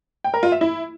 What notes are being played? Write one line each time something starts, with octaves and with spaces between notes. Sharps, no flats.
G5
A#4
F4
E5
E4